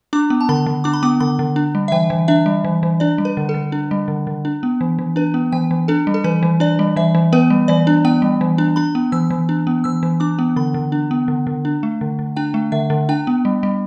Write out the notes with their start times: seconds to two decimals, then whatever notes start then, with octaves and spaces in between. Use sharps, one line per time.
0.13 D4 D6
0.30 B3
0.41 A5
0.49 D3 B5
0.66 D3
0.84 D4 D6
0.93 B5
1.03 B3 D6
1.20 D3 B5
1.39 D3
1.56 D4
1.75 G3
1.88 E5
1.92 E3 G5
2.10 E3
2.28 D4 E5
2.46 G3
2.65 E3
2.83 E3
3.00 D4 D5
3.18 G3
3.25 B4
3.37 D3
3.49 A4
3.54 D3
3.72 D4
3.91 G3
4.08 D3
4.27 D3
4.45 D4
4.63 B3
4.81 E3
4.99 E3
5.16 D4 B4
5.34 B3
5.52 E3 G5
5.71 E3
5.88 D4 A4
6.07 G3
6.14 A4
6.24 E3 B4
6.43 E3
6.60 D4 D5
6.79 G3
6.96 E3 E5
7.15 E3
7.33 B3 B4
7.50 G3
7.68 E3 D5
7.87 D4
8.05 B3 G5
8.22 G3
8.41 E3
8.58 D4
8.76 D4 B5
8.95 B3
9.12 E3 E6
9.30 E3
9.49 D4
9.67 B3
9.84 E3 E6
10.03 E3
10.20 D4 D6
10.39 B3
10.56 D3 B5
10.74 D3
10.92 D4
11.11 B3
11.28 D3
11.47 D3
11.65 D4
11.83 A3
12.01 D3
12.19 D3
12.36 D4 G5
12.54 A3
12.72 D3 E5
12.90 D3
13.09 D4 G5
13.27 B3
13.45 G3
13.63 G3